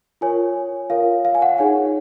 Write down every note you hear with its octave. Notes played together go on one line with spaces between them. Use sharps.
F4 A#4 C#5 G#5
F4 A#4 C#5 F5
F5
G#5
F#5
D#4 G#4 C#5 G#5